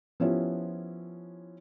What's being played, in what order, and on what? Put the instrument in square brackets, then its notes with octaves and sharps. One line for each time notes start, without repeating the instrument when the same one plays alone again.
[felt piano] F3 B3 C#4 E4 F4 G4